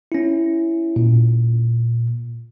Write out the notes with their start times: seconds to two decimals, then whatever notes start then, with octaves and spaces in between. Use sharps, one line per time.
0.12 C#4 E4
0.96 A#2